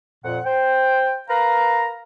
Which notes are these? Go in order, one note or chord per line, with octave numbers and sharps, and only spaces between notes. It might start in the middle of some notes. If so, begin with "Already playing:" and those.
F2 A#2 F#5
C5 G5
A#4 B4 F5 A#5